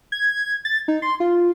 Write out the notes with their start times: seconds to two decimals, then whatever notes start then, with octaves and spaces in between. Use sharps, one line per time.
0.12 G#6
0.65 A6
0.88 D#4
1.02 C6
1.20 F4